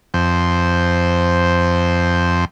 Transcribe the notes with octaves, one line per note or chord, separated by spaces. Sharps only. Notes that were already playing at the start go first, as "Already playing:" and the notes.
F2 C5